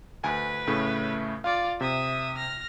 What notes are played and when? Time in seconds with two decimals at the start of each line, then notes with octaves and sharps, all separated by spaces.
0.24 D2 B4 G#5
0.67 A2 C#3 A3
1.44 F4 D5 F5
1.81 C3 E5 D#6
2.38 F6 A#6